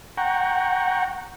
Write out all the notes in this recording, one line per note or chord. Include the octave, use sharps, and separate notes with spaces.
F#5 G5 A#5 C#6